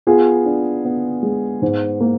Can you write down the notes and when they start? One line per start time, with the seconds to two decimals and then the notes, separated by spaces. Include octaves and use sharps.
0.07 B3 F4 G#4
0.45 D4
0.85 B3
1.23 G#3
1.62 G#2
2.00 A#3